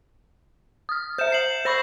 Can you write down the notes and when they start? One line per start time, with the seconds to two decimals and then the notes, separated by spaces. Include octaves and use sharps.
0.89 D#6 F6
1.18 C5 E5 G6 E7
1.30 G6 C7 F#7
1.65 C5 B5 C#6 E6 A#6 E7